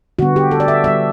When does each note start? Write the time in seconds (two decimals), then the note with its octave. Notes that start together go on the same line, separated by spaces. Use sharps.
0.19 D3 G3 B3 F#4
0.36 G4
0.51 A4
0.60 D5
0.68 E5
0.84 D3 G3 B3 E5